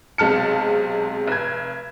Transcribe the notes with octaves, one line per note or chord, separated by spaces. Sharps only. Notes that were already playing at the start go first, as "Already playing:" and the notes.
B1 C3 G#3 A5 F6 C#7
F1 G#6